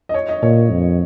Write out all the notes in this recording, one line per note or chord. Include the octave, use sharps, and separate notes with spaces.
D#5
C#5
D#5
A#2 C#5
F2